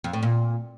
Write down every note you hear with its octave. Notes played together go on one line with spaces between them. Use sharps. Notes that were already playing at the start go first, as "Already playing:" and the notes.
F2
A2
A#2